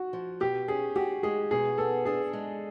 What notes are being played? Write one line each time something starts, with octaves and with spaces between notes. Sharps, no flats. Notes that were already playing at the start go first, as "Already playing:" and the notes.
Already playing: F#4
F3
B2 G4
C#4 G#4
F#4 G4
G#3 G#4
B2 G#4
B3 A4
D4 G#4
G#3